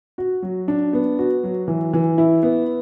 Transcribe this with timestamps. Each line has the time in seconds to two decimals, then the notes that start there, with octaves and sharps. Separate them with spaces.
0.18 F#4
0.42 F#3
0.68 D4
0.93 B3
1.19 F#4
1.43 F#3
1.68 E3
1.93 E3
2.18 E4
2.43 B3